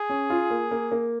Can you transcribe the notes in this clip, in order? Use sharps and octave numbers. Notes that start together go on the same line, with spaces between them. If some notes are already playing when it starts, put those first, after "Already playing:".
Already playing: G#4
C#4
F4
A#3
A#3
A#3